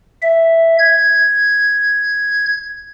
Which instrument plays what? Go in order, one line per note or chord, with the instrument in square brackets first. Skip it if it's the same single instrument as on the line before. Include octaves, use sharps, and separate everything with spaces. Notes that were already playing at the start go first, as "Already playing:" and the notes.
[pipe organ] E5
G#6